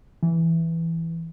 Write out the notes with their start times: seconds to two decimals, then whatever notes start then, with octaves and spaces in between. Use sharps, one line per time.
0.23 E3